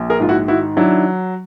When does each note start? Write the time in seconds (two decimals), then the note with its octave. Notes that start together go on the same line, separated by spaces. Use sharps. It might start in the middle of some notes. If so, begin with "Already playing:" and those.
Already playing: A#1
0.10 G#4 A#4
0.20 G#2 F4
0.29 E4 F#4
0.48 D#3 E4 F#4
0.77 F#3 D4 E4